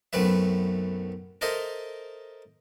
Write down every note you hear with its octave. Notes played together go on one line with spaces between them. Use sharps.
B1 F#2 A3 C4 B4 E5
A4 A#4 C5 D#5 E5